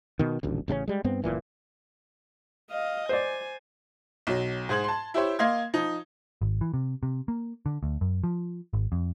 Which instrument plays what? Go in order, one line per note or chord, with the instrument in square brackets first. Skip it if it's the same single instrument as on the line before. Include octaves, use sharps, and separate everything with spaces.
[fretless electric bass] B2 D#3
D#1 A1 D2
A1 C#3 G3 C#4
G3 G#3
G2 B3 C4
F#1 B1 A#2 E3
[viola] D#5 F5
[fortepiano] C5 D5 [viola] G#5
[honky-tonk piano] B1 F#3
G#2 G#4 C5 G#6 F#7
A5 C6
E4 G4 C5 C#5
A#3 D#5 F5 C6 G#6
F3 D#4
[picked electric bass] G#1
E3
C3
C3
A#3
D3
D2
F#2
F3
G#1
F2